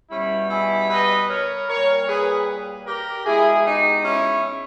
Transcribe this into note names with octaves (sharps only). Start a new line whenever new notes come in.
B2 G3 C#4 E4
E4 G#4
B4 D#5
A#4 C#5
A#2 G3 A#4 C#5
G#4 B4
G4 A#4
B2 G#3 E4 G#4
D#4 G4
C#4 E4